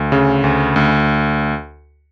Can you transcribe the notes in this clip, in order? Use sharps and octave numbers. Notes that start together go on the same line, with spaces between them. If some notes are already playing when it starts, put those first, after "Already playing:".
Already playing: D2
C#3
D2
D2